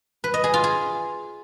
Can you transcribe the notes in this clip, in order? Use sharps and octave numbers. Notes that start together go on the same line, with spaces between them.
B4
D#5
G#4
F4
G#4